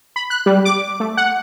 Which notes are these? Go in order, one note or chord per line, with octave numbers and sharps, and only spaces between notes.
B5
F#6
G3
D6
A3
F#5